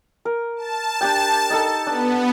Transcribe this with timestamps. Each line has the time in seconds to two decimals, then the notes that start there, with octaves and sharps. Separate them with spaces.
0.25 A#4
0.56 A5
1.01 D4 G4 G5
1.50 D#4 A4
1.87 B3 D4